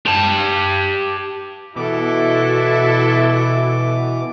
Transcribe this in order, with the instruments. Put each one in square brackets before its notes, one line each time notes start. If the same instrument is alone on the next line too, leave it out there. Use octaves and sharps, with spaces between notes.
[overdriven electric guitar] G4 A5
[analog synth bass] B2 [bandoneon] E3 D6 [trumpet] E4 [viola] F#4 A4